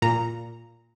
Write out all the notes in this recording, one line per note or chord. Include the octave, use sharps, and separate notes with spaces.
A#2 A#5